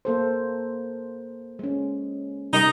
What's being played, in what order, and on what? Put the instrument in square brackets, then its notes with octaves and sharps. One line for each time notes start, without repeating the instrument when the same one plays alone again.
[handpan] A#3 A4 C5
G#3 C#4
[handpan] C3 G3 [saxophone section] D#4